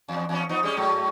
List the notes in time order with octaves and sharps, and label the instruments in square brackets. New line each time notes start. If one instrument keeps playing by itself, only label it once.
[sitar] E2
E2 C#4
F3 B3 D#4
G3 G#3 C#4
G#2 F#3 A3